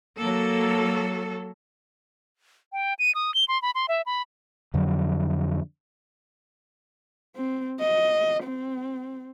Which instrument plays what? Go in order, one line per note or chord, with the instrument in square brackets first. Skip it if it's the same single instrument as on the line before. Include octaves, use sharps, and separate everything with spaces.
[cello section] F#3 A4 [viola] A#3
[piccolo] G5
D#7
D#6
G7
C6
B5
C6
E5
B5
[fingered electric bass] F2 D3 F#3
[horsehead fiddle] C4
D#5
C4